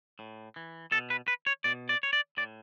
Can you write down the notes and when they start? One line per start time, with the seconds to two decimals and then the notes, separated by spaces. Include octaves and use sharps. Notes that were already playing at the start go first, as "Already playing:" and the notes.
0.19 A2
0.56 E3
0.91 B2 A4
1.10 B4
1.28 B4
1.47 C#5
1.64 B2 D5
1.89 D5
2.03 C#5
2.13 D5
2.37 A2 D5